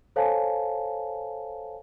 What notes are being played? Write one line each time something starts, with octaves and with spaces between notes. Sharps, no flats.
A4 C5 C#5 F5 G#5 A5